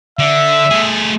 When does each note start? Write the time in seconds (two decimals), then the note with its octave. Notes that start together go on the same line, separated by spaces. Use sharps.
0.19 D3 E5
0.71 A3 G#4